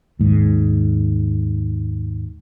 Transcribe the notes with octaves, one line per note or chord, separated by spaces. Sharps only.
D#2 G#2